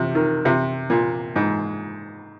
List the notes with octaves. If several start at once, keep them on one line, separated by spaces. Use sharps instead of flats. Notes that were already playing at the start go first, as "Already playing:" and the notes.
Already playing: C3
D#3
C3
A#2
G#2